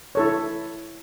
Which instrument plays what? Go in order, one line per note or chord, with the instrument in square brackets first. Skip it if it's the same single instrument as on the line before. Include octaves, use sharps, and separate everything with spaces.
[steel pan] E4 A4 C#5